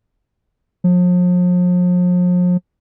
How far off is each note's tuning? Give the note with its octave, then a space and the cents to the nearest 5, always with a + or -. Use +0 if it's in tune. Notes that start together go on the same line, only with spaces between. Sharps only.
F3 +40